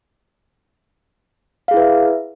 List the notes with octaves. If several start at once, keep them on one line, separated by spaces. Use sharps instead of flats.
E4 G#4 B4 E5 F5